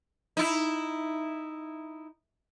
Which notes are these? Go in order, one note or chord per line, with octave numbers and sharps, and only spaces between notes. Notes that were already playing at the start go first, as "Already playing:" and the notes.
D#4 E4